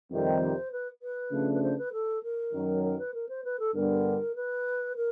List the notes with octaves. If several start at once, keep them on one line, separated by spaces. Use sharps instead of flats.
F2 C3 D#3 G3 C5
B4
B4
C#3 F3 A3 D4
B4
C5
B4
A4
A#4
F#2 D#3 F#3
A#4
B4
A#4
C5
B4
A4
G2 D3 G3 B3 A#4
B4
A#4